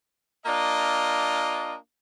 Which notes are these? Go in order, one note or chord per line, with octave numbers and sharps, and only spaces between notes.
A#3 D4 F4 D#5